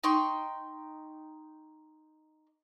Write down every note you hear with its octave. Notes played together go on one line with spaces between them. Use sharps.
D#4 G5 C6 C#6